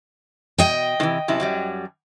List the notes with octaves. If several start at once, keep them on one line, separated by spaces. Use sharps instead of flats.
B2 D#5 G5
A2 C3 E3
F#2 C3 E4
F#2 F#3 G3